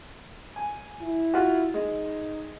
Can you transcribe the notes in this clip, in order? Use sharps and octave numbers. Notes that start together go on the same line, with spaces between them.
G#5
E4
F4 F#4
G#3 D#4